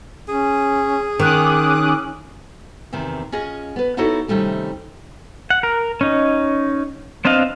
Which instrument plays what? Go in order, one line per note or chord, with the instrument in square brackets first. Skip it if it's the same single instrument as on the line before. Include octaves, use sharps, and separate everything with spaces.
[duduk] C#4 [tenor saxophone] G#4
[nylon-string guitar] D#3 [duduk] C#4 [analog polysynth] D6 D#6 F#6
[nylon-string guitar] E2 C3 D#3
C#4 F4 G#4 D#5
B3 B4
B3 D#4 E4 F#4 A4 C#5
C3 D#3 G3 A3 C#4
[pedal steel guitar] F#5
A#4
C#4 D#4
B3 C4 D4 D#5 F5